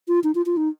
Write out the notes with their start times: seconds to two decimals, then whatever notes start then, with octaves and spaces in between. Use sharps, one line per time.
0.08 F4
0.24 D#4
0.35 F4
0.46 F4
0.57 D#4